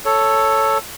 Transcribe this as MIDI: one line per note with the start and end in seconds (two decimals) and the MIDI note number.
0.05 0.78 69
0.05 0.78 73